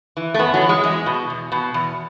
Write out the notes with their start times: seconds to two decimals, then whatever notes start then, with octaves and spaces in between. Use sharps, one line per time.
0.17 E3
0.34 A3
0.39 F#2 B3
0.54 F#3
0.62 E3
0.69 G#3
0.84 E2 G#3
1.06 B2
1.30 E2
1.52 B2
1.74 E2